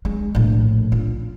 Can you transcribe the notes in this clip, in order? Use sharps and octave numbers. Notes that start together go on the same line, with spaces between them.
G#3
A#1 A2
F4